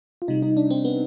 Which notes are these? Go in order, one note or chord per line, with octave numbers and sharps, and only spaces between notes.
F4
C3 G3 D#4
D#4
D4
C4
B3